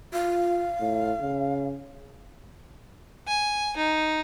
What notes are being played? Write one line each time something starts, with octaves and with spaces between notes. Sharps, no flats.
F4 F5
A2
C#3
G#5
D#4